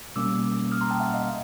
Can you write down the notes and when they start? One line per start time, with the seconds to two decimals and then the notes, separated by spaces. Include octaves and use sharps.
0.16 B2 G3 A#3 C#4 D6 E6
0.72 D#6 F6
0.81 A#5 C6
0.91 G5 A5
1.00 E5 F#5
1.14 D#5 F5